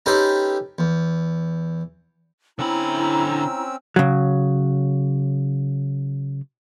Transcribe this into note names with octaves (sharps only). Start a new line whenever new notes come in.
C#4 D#4 G4 A4 B4 C5
E2
D3 C4 C#4 E4 A#5 B5 E6
C#3 F#3